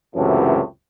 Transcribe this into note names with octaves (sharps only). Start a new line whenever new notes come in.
C#2 F#2 A2 C3 E3 F#3